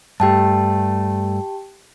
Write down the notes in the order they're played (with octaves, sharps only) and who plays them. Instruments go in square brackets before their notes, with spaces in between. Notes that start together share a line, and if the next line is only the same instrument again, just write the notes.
[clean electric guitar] G2 A3 [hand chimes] G4 G5 A5